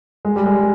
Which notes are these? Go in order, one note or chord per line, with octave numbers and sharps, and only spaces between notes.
G#3
G3
G#3